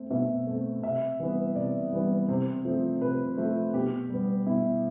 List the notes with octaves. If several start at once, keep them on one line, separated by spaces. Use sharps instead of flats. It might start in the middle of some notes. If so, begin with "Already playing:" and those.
Already playing: A3 C4
B2 E5
A3 C4
C3 E5
E3 G3 B3
C3 D5
E3 G3 B3
C3 C5
F3 A3 C4
C3 B4
F3 A3 C4
B2 G4
G3 B3
B2 E4